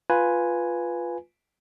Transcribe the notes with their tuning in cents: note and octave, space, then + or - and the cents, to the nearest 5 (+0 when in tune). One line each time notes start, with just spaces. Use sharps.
F4 +0 B4 +0 G#5 +0